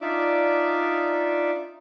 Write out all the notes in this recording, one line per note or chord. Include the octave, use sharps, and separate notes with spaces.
D4 D#4 F4 D5 E5 D6